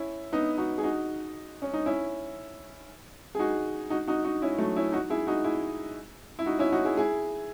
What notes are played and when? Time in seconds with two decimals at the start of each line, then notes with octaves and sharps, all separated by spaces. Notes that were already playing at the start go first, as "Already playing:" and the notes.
Already playing: C#4 E4
0.32 B3 D#4
0.58 D#4 F#4
0.78 G#4
0.83 D#4 F#4
1.62 C#4
1.74 D#4
1.86 C#4 E4
3.35 G#4
3.39 D#4 F#4
3.90 D#4 F#4
4.07 D#4 F#4
4.24 D#4 F#4
4.42 C#4 E4
4.58 F#3 A3
4.76 C#4 E4
4.92 D#4 F#4
5.10 E4 G#4
5.27 D#4 F#4
5.44 E4 G#4
6.39 E4
6.46 D#4 F#4
6.59 C#4 E4
6.72 D#4 F#4
6.84 E4 G#4
6.97 E4 G#4